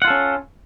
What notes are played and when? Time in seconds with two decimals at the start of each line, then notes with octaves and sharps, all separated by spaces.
0.02 F#5
0.05 F4
0.07 A4
0.10 C#4